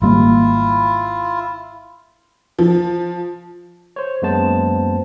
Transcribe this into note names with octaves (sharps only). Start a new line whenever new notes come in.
G#1 G3 A#3 E4 F4
F3
C5 C#5
F#2 G#3 A#3 B3 C5 A5